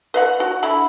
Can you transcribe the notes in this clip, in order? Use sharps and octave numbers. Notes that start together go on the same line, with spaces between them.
B4 F5 F#5
F#4
D3 E4 B5